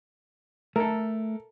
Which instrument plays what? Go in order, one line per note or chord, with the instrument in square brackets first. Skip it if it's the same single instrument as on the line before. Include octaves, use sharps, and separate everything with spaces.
[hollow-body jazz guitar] A3 [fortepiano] A4 A#4